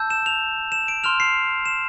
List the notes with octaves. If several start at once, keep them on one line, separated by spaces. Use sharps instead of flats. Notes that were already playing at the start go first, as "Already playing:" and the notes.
Already playing: A5 E6 G6
E7
F7
E7
D7
C6 F6 F7
C7
E7